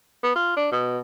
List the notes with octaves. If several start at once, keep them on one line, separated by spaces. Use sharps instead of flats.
B3
F4
D4
B2